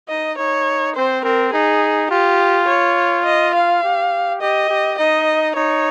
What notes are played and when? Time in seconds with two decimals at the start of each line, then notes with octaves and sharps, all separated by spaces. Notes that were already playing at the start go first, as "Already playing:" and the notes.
0.09 D#4 D#5
0.38 D#4 C#5
0.96 C4 C5
1.24 C4 A#4
1.53 D#4 G#4
2.11 F4 G4
2.68 C#5
3.25 D#5
3.55 F5
3.83 G4
4.41 G4 D#5
4.69 G4
4.98 D#4 D#5
5.55 D#4 C#5